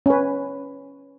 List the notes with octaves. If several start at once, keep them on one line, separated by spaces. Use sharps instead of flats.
C#4 B4